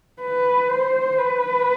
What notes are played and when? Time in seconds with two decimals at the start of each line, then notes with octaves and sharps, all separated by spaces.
0.22 B4
0.70 C5
1.19 B4